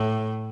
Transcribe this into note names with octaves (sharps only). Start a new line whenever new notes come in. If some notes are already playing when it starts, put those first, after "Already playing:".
Already playing: A2